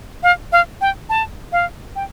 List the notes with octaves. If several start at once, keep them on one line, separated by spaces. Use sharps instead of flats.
F5
F5
G5
A5
F5
G5